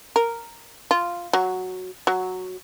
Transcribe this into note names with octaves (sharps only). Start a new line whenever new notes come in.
A#4
F4
F#3
F#3